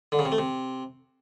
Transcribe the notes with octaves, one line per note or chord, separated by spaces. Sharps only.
D3
C#3
C3
A3
C3